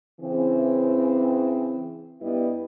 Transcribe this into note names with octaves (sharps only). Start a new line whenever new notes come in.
C#3 E3 C4
G2 G3 B3 E4 B4 D#5